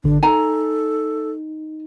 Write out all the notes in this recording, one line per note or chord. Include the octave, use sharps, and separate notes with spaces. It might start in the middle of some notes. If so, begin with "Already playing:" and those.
G#1 D3 D4
D#4 A4 G#5 A#5